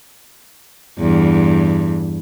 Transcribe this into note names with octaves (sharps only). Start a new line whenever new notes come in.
E2 G2